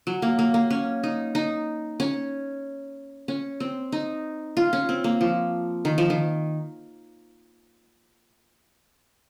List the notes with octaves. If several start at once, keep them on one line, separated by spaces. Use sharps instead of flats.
F#3
A#3
A#3
A#3
C#4
D#4
D#4
C#4
C#4
C4
D#4
F4
C#4
C4
A#3
F3
D#3
F3
D#3